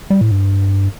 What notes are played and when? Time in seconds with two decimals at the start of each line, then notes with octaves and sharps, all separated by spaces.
0.10 G3
0.21 A2
0.31 G2